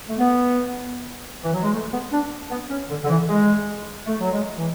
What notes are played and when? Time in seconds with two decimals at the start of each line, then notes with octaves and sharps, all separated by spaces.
0.09 A3
0.18 B3
1.43 E3
1.53 F#3
1.63 G#3
1.73 A3
1.92 B3
2.12 D4
2.50 B3
2.70 C#4
2.90 D3
3.04 D3
3.09 E3
3.28 G#3
4.06 A3
4.19 F#3
4.32 G#3
4.58 E3